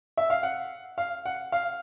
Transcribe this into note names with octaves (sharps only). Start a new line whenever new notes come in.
E5
F5
F#5
F5
F#5
F5